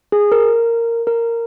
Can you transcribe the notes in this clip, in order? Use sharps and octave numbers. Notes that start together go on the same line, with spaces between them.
G#4
A#4
A#4